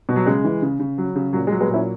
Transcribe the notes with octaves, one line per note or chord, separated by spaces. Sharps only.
B2
F#3
C#3 G#3
E3
C#3
C#3
F#3
C#3
A#2 F#3
G#3
F#3
G#3 B3
A#2 C#4 E4